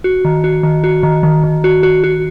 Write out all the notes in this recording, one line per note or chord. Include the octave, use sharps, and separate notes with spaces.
F#4
D#3
F#4
D#3
F#4
D#3
D#3
D#3
F#4
F#4
F#4